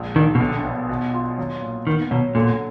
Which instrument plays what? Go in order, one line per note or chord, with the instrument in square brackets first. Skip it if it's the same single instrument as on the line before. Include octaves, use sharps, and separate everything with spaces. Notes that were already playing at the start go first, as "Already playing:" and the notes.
Already playing: [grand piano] A#1 G#3
[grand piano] A#1 [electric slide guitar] D#3
[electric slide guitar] B2
[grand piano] B1 [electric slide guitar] D3
[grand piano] B3
B2
F4
F#3
A#2
[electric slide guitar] D#3 [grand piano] B3
[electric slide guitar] B2 [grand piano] F#3
[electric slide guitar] A#2 [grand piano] D3